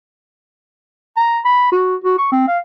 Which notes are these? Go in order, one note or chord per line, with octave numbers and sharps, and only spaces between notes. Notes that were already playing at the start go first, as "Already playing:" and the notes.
A#5
B5
F#4
F#4
C#6
C4
F5